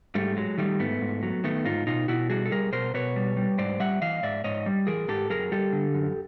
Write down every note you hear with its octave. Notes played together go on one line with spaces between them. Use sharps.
G#2 G3 A3
F#3 G#3
D#3 G3 A3
G#2 A3 B3
G#2
F#3
D#3 A3 B3
G#2 D#4 F4
B2 D#4 F4
B2 E4 F#4
G3 F#4 G#4
A4
G3 G#4 A#4
B2 A#4 C5
B2 B4 C#5
G3
G3
G#2 C5 D5
G3 E5 F#5
E3 D#5 F5
G#2 D5 E5
G#2 C#5 D#5
G3
E3 G#4 A#4
G#2 G4 A4
F#2 G#4 A#4
G3 G4 A4
D3
F#2